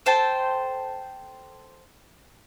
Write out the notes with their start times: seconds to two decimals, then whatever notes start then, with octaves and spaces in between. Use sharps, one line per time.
0.06 A4 C5 G5 A5